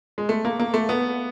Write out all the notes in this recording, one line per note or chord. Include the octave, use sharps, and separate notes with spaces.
G#3
A3
A#3
A#3
A3
B3